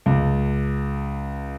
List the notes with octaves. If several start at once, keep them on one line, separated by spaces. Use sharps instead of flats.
C#2